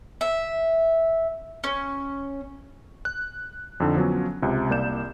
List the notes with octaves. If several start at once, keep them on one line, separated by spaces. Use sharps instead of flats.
E5
C#4
F#6
F2 D3 D#4
F3 F#3 B3 C#4
C#2 C3
C2 A#3 D5 G6 E7